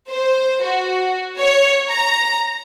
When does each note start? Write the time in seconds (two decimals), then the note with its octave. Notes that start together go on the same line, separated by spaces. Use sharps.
0.11 C5
0.64 F#4
1.40 C#5
1.91 A#5